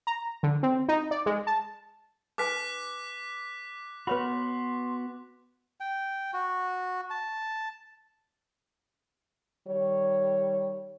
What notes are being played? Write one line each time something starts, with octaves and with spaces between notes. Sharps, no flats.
A#5
D3
C4
D#4
D5
G#3
A5
D#4 B4 G#5 D6 F#6 B6
B3 F#4 B4 C#5 B5 C6
G5
F#4
A5
D#3 G3 C#5